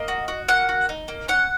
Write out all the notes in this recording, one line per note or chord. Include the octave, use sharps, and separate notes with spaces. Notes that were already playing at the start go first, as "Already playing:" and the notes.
Already playing: A#3 D#5
F#4
F#4
A#3 F#5
F#4
D#4
A#3
C#4 F#5